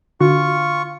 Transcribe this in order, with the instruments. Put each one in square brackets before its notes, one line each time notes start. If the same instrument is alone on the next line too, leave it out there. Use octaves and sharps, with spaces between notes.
[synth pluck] D3 [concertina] F4 C#6 [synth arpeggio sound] F#4